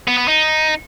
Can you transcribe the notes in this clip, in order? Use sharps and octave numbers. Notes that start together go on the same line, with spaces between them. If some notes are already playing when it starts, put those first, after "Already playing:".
B3
B3
D#4